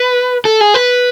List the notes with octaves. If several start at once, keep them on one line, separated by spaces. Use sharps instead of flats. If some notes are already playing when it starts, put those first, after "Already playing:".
Already playing: B4
A4
G#4
B4